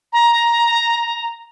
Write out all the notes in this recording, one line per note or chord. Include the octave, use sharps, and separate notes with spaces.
A#5